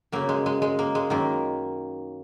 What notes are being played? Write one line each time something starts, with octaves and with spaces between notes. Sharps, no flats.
F#2 C#3 A#3
G#3
G#3
G#3
A#3
G#3
F#2 D#3 A#3